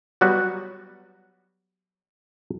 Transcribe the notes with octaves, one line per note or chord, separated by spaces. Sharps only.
F#3 G3 B3 F#4